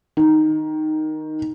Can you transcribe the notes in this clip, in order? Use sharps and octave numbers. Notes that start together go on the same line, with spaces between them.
D#3